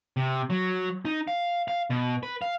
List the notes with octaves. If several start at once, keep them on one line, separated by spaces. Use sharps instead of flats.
C3
F#3
D#4
F5
F5
B2
B4
F5